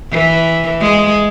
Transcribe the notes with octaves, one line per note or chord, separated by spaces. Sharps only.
E3
G#3